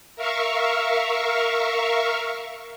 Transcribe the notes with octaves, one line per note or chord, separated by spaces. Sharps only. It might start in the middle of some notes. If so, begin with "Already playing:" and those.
A#4 E5 F5 C#6